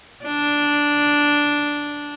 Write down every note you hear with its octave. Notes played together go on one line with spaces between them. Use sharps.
D4